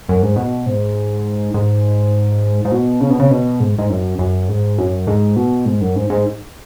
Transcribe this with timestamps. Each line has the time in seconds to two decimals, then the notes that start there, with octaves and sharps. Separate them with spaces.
0.09 F#2
0.22 G#2
0.36 B2
0.66 G#2
1.54 G#2
2.65 G#2
2.72 B2
3.01 C#3
3.10 B2
3.20 C#3
3.31 B2
3.60 G#2
3.79 G#2
3.90 F#2
4.19 F#2
4.49 G#2
4.78 F#2
5.07 G#2
5.36 B2
5.66 G#2
5.81 F#2
5.96 G#2
6.10 G#2